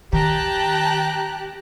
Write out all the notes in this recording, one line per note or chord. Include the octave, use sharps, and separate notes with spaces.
D#3 G4 G5 A5 A#5 F#6